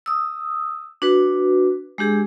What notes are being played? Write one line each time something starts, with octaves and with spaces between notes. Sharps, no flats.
D#6 E6
D4 F#4 B4
G#3 D4 G4 G#4